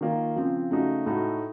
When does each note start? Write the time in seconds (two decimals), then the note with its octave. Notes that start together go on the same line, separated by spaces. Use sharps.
0.01 D#3 A#3 F4
0.36 C#3 F3 C4
0.71 C#3 A3 D#4 F#4
1.06 A2 A3 D#4 F#4